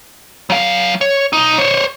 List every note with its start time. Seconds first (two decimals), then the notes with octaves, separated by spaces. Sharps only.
0.50 F#3 F5
1.01 C#5
1.33 B1 D#4
1.58 C5 C#5